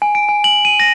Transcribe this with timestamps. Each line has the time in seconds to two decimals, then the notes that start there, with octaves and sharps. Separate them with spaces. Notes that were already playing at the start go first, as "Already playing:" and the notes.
0.02 G#5
0.15 D7
0.29 G#5
0.44 F#7
0.65 D#7
0.80 A#6